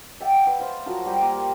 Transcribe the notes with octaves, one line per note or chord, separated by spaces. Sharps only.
D5 E5 F#5 G5
B4
C5 F5
F3 F#3 F#4 A#4
G3 G4 G5
A#3 A#4 C6